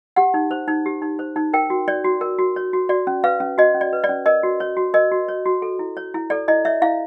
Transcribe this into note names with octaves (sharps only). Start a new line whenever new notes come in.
G4 F#5
D#4
C5
D#4
G4
D#4
C5
D#4
A#4 G5
F#4
C#5 D5
F#4
A#4
F#4
C#5
F#4
F#4 D5
C#4
B4 F5
C#4
F#4 D#5
C#4
D5
B4
D5
C#4
A#4 D#5
F#4
C#5
F#4
A#4 D#5
F#4
C#5
F#4
A4
E4
C#5
E4
A4 D5
E4 D#5
C#5 E5
E4 F5